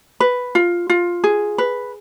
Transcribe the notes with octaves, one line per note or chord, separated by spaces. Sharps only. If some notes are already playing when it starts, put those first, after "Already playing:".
B4
F4
F4
G#4
B4